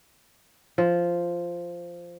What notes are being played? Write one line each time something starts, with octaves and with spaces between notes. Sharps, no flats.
F3